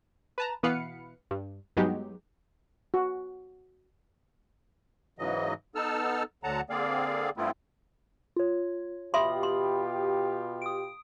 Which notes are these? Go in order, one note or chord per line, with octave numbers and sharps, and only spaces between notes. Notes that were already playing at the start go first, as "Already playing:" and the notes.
B4 A5 A#5
B2 E3 B3 B4 F5 C#7
G2
G2 F#3 G#3 B3 D#4 G4
F#4
G#2 C#3 E3 F#3 D#5
B3 D#4 A4 A5 E6 F6
D2 D3 F#3 F#5 A5 A#5
D3 A#3 C4 G#4 D5 F5
G2 A3 B3 C4 E4 F4
F4 C#5
B2 F4 G4 E5 B5 C6 D#6
C6
D#6 D7